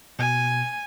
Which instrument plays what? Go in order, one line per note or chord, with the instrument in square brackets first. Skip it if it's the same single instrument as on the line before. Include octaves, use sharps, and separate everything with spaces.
[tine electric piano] B2 [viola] G#5